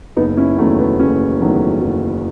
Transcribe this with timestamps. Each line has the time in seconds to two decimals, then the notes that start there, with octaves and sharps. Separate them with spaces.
0.17 F#1 B3 D#4
0.37 C#4 E4
0.58 E2 D#3 F#3 A3 C#4
0.79 B3
0.99 F#1 C#4
1.41 E2 D#3 F#3 A3
1.82 F#1